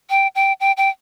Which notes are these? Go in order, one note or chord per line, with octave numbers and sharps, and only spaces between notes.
G5
G5
G5
G5